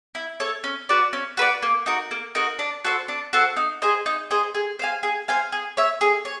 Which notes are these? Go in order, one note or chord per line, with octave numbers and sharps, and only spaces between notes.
E4
A4 C#5
C#4
F#4 B4 D5
C#4
F#4 B4 D5
A#3
D#4 F#4 A#4
A#3
D#4 F#4 A#4
D4
F#4 A4 C5
D4
F#4 A4 C5
D#4
G#4 C5 D#5
D#4
G#4 C5 D#5
G#4
C5 F5 G#5
G#4
C5 F5 G#5
G#4
C#5 E5
G#4
C#5